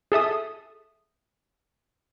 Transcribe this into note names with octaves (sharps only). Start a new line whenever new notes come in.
G#4 A4 E5 D#6